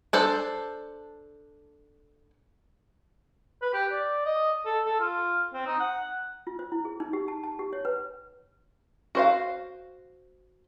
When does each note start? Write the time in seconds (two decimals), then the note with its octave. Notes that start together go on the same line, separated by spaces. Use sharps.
0.13 D4 A4 C5
3.62 B4
3.73 G4
3.91 D5
4.26 D#5
4.66 A4
4.86 A4
5.00 F4
5.54 C4
5.66 D#4
5.80 F#5
6.47 F4
6.59 C5
6.72 E4
6.85 G#4
7.00 D#4
7.13 G4
7.28 A5
7.43 A5
7.59 G4
7.73 C#5
7.85 B4
9.15 F#4 C5 F5